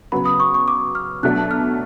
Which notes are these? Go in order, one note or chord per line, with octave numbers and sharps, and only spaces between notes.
C#3 F#3 B3 B5
D#6
C#6
C#6
D6
F6
B2 F#3 A3 D4 F#6
F6